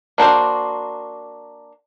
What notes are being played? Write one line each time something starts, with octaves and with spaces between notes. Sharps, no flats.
A#3 D4 F#4 C5